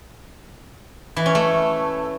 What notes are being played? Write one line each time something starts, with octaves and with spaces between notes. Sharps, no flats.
E3
C#4
A3